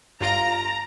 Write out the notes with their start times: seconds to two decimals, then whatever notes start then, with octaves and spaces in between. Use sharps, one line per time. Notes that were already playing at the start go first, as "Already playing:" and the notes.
0.21 G1 F4 A#5 D7